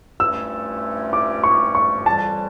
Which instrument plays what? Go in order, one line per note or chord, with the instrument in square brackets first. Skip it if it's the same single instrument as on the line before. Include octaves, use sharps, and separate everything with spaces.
[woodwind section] G2 F3 A3 C#4 E4 [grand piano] E6
[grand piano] D6
C#6
C#6
[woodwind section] F2 C#3 E3 G3 [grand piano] A5